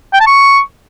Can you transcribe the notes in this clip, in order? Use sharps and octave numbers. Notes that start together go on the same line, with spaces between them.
G5
A5
C#6